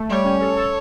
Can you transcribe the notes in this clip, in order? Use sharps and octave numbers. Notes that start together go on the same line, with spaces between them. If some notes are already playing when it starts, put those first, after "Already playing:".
Already playing: A3
G3 C#5
C#4
A4
A4